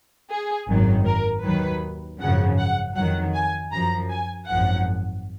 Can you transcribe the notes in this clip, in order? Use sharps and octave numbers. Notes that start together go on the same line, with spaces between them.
G#4
G#1 F#2 D#3 F#3
A#4
D#2 D#3 F#3 B4
G#1 F#2 C#3 F3 F#5
F#5
F2 D#3 F#3 F#5
G#5
F#2 F3 A#5
G#5
G#1 F#2 F3 F#5